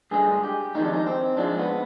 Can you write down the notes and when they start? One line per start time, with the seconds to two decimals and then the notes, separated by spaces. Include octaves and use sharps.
0.11 G2 D3 G#3 G#4
0.43 G4
0.74 F2 D#3 G#3 D#4
0.85 D4
0.93 D#4
1.06 C4
1.37 G#2 F3 G#3 D4
1.58 B3